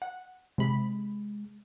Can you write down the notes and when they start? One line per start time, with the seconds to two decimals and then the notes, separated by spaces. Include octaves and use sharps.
0.02 F#5
0.58 C3 G#3 B5